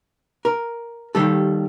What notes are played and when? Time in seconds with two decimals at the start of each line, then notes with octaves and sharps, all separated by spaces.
0.45 A#4
1.15 D#2 D#3 G3 A4